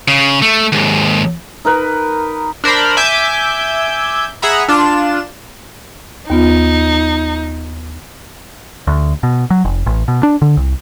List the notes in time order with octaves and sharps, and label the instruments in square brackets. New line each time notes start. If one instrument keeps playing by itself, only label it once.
[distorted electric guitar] C#3
A3
D#2 G#2
[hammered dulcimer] D#4 A#4 B4
[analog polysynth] D4 A#4 C5 B5
E5 G#5 D6 G6
G#4 E5 F#5 A#5 B5
D4 F4 E7
[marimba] D#2 B3 F4 [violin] D#4
[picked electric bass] D2
B2
F#3
F1
A1
B2
D4
D3
C2